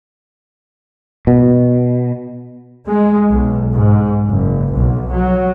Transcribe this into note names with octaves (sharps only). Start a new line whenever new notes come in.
B2
G#3
B1
G#2
F#1
B1
F#3